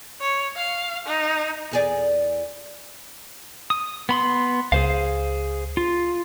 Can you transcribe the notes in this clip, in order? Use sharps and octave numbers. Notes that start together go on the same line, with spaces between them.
C#5
F5
D#4
E2 G#4 D5
D#6
B3 B5 C6
C#2 G#4 C5 F5
F4